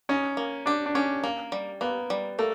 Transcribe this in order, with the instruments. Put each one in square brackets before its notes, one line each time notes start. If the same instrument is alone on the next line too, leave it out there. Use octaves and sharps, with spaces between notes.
[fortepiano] C#4 [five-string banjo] D#4
[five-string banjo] A#3
[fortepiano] D4 [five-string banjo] G4
[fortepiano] D4
[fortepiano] C#4 [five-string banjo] G4
[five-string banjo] A#3
G3
[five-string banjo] A#3 [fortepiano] B3
[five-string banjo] G3
[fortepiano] A3 [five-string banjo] A#3